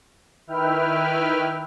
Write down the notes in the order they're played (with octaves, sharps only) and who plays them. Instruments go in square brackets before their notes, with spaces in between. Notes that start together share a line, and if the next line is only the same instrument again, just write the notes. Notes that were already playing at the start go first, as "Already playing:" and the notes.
[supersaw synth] D#3 E4 B4 E5 G5 F6